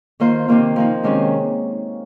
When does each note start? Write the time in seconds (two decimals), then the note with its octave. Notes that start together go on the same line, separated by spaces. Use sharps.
0.20 D#3 A#3 F4 C5
0.48 C3 D#3 A#3 F4
0.76 F3 A#3 D#4
1.03 C3 D#3 G#3 C#4